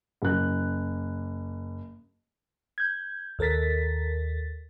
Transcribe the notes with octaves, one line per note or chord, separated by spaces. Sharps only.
F#1 F#6
G6 G#6
D#2 A4 A#4 A6 B6